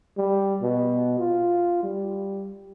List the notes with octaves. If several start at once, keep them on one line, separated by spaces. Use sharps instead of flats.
G3
B2
F4
G3